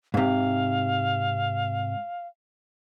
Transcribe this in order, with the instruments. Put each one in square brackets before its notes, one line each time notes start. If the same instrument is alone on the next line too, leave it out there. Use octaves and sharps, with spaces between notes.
[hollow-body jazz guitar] G#2 C3 [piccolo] F5